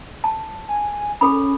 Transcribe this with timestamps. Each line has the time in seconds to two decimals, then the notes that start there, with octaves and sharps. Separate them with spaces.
0.24 A5
0.68 G#5
1.21 C#4 G#4 A4 B5